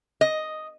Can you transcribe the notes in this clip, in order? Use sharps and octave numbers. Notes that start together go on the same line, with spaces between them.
D#5